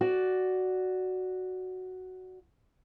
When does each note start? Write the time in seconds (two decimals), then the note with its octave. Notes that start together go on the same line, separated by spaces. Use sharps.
0.01 F#4 D5